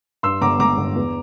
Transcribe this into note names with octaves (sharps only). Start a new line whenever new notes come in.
G2 C6 E6
G1 A#5 D6
G1 A#5 D6
G1
E2